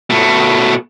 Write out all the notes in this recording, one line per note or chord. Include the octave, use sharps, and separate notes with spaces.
B2 A3